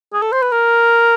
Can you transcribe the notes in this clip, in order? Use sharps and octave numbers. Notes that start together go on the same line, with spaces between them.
G#4
A4
C5
B4
A#4